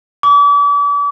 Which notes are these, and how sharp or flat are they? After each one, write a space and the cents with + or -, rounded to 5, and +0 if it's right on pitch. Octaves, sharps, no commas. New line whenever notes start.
D6 -40